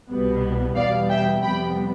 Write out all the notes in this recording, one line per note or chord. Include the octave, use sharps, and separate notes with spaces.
C2 B2 G3 B3
E2 B2 G3 B3 D5 F5
E5 G5
F2 C3 G3 B3 G5 B5